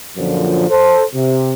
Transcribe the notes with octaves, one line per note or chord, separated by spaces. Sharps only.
F#2 A#2 D3 F3
A4 C5
C3